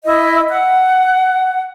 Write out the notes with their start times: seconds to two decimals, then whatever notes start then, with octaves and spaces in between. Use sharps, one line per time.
0.05 E4 D#5
0.48 F#5